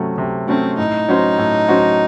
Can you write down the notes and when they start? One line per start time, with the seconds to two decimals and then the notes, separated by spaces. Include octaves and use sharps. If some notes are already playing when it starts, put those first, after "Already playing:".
Already playing: C3 F#3 A3 C#4
0.18 C3
0.47 F#3 A3 C4 C#4
0.78 A2 D#4
1.08 F#3 C#4 F#4 C5
1.38 A2
1.68 F#3 C#4 F#4 C5